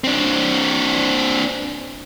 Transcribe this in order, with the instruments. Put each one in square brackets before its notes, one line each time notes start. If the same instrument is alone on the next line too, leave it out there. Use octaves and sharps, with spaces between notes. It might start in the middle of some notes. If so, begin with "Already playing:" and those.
[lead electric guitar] C4 D4